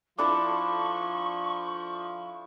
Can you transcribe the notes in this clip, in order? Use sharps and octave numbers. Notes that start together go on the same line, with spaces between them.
F3 D4 E4 A4 C#6 D6